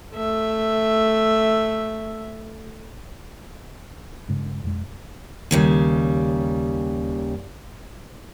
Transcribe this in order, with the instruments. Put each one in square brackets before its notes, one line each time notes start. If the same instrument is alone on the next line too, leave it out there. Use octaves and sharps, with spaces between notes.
[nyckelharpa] A3 E5
[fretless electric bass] G2 C#3 G#3
F2 B2 G#3
[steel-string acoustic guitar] D#2 C#3 G3